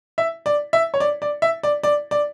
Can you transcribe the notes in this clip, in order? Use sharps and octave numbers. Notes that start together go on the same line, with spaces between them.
E5
D5
E5
C#5
D5
D5
E5
D5
D5
D5